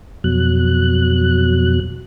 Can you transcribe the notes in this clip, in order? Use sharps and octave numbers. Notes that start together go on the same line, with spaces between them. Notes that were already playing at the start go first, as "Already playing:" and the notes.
F2 B2 F#3 F#6